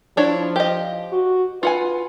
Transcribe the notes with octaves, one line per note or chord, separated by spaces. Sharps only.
F3 D4 E4 C#5
G4 D#5
F#4
F4 B4 F#5 G#5